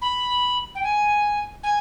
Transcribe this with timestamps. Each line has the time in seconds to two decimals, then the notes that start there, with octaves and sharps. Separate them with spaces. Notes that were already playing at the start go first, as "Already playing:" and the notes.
0.02 B5
0.75 G5
0.83 G#5
1.63 G#5